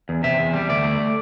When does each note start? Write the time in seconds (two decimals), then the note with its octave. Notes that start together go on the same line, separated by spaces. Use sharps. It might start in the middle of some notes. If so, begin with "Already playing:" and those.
0.09 E2
0.24 C3 E5
0.39 E2
0.54 G3
0.69 D2 D5
0.84 A3